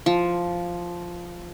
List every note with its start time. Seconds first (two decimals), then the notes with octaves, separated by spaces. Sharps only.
0.06 F3